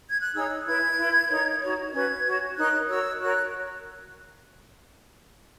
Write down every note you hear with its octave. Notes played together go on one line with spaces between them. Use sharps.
G#6
F#6
D#4 G#4 C#5 E6
E4 B4 G#6
E4 B4
D#4 A#4 C#5
D#4 F#4 C#5
C#4 F#4 B4 G#6
F#4 C#5
D#4 A#4 C#5 F#6
F#4 A#4 C#5 E6
F#4 A#4 C#5 F#6